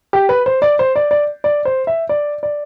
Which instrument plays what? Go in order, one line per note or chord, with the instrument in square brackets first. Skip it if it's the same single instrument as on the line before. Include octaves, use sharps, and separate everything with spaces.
[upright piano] G4
B4
C5
D5
C5
D5
D5
D5
C5
E5
D5
D5